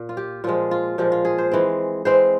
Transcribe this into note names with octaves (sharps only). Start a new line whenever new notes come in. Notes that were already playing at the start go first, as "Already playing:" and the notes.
Already playing: A#2
F4
G4
A#2 F3 G#3 F4
F4
A#2 F3 G#3 G4
F4
G#4
C5
E3 G#3 C4
E3 G#3 C4 C5